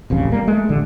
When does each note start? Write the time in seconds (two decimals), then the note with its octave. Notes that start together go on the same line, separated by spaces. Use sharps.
0.10 D#1 A1 F2 C#3
0.32 G3 A#3
0.47 G#3 A3
0.69 A1 D3